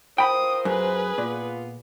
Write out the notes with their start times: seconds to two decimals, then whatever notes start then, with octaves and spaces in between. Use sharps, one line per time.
0.18 F4 A#4 C5 G5 B5 D#6
0.65 F#2 G#4 B4
1.18 A#2 B3 F4